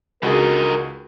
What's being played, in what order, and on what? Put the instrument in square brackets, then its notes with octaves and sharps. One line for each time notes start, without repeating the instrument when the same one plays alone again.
[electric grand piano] C#2 F#4 G#4 [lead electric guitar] D3 D#4 [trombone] A#4